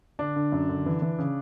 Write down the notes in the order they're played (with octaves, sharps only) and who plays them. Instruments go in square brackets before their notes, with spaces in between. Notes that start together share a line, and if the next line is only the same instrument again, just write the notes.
[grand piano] D3 D4
D3
F#2
D3
E3
E3
C#3